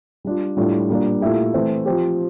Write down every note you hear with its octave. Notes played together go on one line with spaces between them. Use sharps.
G3 D4 F4
A2 G3 D4 F4
A#2 G3 A#3 D4
A#2 A3 E4 G4
E3 A3 C4 E4
F3 C4 G4